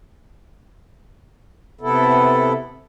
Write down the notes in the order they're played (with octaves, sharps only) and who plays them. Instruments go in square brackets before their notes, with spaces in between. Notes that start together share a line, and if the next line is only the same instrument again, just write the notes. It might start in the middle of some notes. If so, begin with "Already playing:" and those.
[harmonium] C3 B3 E4 A4